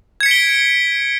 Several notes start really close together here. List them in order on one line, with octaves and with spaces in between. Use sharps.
G#6 C#7 B6 D7 G7